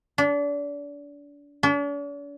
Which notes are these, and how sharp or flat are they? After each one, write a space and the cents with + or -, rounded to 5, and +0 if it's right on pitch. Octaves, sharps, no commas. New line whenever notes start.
D4 -30
D4 -45